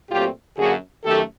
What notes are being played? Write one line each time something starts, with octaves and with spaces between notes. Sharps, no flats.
A#2 F#3 A3 C4 F4 G4
F#2 D3 F#3 A#3 F#4 G#4
F#2 D#3 F#3 A3 G4 A4